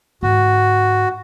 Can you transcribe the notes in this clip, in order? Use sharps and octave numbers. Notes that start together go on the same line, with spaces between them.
G#2 D3 F#4